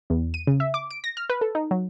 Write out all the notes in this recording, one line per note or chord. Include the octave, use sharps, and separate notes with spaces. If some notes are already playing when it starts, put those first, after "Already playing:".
E2
D#7
C#3
E5
D6
D7
A#6
F6
B4
A4
D#4
F#3